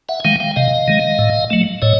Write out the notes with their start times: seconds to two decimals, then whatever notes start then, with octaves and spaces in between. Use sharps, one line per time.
0.09 E5 F#5
0.20 G#5
0.25 D#3 G#3 F5 G5
0.40 F5 G5
0.56 C3 D#5 F5
0.88 D#3 G#3
1.19 A2
1.50 F#3 A3
1.82 A2 C#5 D#5